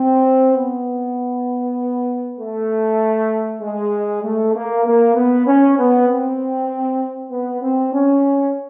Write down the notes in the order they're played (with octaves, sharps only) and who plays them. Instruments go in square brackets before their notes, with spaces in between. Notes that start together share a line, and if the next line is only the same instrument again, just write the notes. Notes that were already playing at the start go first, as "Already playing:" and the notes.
Already playing: [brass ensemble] C4
B3
A3
G#3
A3
A#3
A#3
B3
C#4
B3
C4
B3
C4
C#4